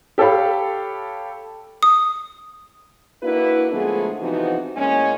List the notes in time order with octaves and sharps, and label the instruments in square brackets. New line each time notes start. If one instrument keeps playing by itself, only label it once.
[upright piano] G4 A4 C#5 F5 B5
[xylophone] D#6
[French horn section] A#3 D4 E4 F#4 B4
D3 F3 G#3 A3 B3 G#4
C3 E3 F3 B3 D#4 F#4
A2 G#3 A#3 C#4